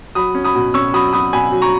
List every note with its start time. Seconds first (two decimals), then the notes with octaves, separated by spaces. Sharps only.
0.15 F#3 B5 D#6
0.35 C#4
0.44 B5 D#6
0.55 B2
0.74 C#4 C#6 E6
0.94 F#3 B5 D#6
1.13 F#3 B5 D#6
1.33 B2 G#5 B5
1.52 F#3
1.62 A#5 C#6